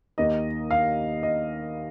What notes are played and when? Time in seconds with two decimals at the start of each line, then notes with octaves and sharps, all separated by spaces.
0.18 D#2 D#3 A#3 D#4 D#5
0.71 F5
1.23 D#5